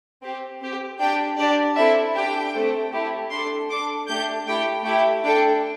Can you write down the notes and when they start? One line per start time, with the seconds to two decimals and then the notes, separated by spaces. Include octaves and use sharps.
0.22 C4 G4
0.61 C4 G4
0.99 D4 G4 G5
1.38 D4 G4 D5
1.76 C4 E4 A4 E5
2.15 D4 G4 G5
2.54 A3 C4 A4
2.92 A3 E4 G4
3.30 D4 A4 C6
3.69 D4 A4 D6
4.08 A3 D4 G4 G6
4.47 A3 E4 G4 G5
4.85 A3 E4 G4 G5
5.24 D4 A4 G5